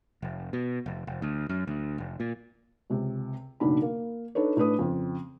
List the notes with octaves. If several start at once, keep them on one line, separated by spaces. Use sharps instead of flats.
F1
B2
F1
F1
D2
F#2
D2
F1
A#2
C#2 C3
F#1 B1 D#3 D4 B5
A#3
D4 D#4 A4 B4 C#5
A2 D4 B4 D#6
F2 C#3 C4